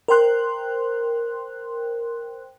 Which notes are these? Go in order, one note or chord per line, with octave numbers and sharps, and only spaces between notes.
A#4 C5 G5 C6 F#6